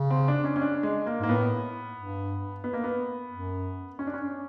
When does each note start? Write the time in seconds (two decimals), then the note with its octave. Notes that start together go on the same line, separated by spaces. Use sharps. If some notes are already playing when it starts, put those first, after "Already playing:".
Already playing: C#3
0.10 C4
0.28 D4
0.44 C#4
0.56 C#4
0.62 D4
0.83 G#3
1.06 A#3
1.20 G#2 A#3
1.29 A2 B3
1.97 G2
2.64 B3
2.73 A#3
2.84 B3
3.31 F#2
3.99 C#4
4.07 D4
4.14 C#4